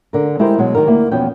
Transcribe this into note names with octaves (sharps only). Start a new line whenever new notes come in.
D3 A#4
G#3 E4 G4 A#4 C5
B2 F#3 G#3
D#3 D#4 G4 A#4
D2 A#3 E4
E2 B2 F3 B3 C#4 G5